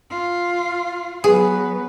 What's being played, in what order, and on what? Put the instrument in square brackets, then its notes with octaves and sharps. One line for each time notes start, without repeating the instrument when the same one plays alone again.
[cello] F4
[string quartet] F#3 B3 B4 [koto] G#4